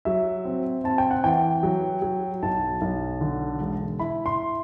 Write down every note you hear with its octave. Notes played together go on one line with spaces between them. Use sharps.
F#3 E5
C4
C4 A5
G5
F#5
E3 G5
F#3
F#3
B1 A5
B1
D3
E1
E4 B5
C6